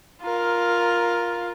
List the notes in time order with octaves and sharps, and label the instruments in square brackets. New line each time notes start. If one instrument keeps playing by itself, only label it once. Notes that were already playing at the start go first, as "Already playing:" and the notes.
[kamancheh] F4 A#4